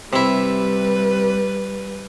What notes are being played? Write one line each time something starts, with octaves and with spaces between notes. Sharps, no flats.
C3 G3 E4 B4